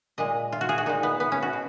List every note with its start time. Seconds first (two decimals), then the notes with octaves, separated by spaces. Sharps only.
0.18 A#2 G#3 D#5
0.52 F4
0.61 F#4
0.69 G#4
0.78 F#4
0.86 A#2 G#3 D#4
1.03 B3
1.20 B3
1.32 C#4
1.42 F#4
1.53 B2